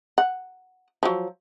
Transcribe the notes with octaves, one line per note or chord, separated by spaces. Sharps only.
F#5
F3 F#3